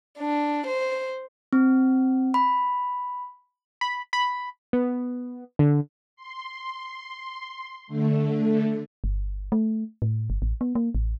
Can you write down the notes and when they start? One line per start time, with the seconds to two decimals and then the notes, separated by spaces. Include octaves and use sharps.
0.19 D4
0.67 C5
1.53 C4
2.34 B5
3.81 B5
4.13 B5
4.73 B3
5.59 D3
6.16 C6
7.87 D3 A3
9.04 G1
9.52 A3
10.02 A2
10.30 G1
10.42 A1
10.61 B3
10.75 A#3
10.95 A1